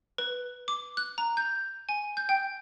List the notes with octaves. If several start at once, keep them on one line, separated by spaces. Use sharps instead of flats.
B4
D6
F#6
A#5
G6
G#5
G6
G5